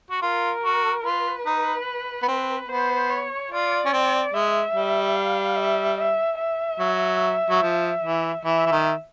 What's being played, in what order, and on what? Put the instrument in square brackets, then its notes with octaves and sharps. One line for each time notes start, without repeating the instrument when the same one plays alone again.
[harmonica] F#4
[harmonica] F4 [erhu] A#4
[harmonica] F#4
[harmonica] F4 [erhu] B4
[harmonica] D#4
B3
C4
[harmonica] B3 [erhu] C5
[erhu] C#5
[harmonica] F4 [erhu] D5
[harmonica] C#4
C4
[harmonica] G#3 [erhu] E5
[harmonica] G3
[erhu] F5
E5
E5
E5
[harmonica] F#3
F#3
F3
E3
[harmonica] E3 [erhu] E5
[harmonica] E3
D#3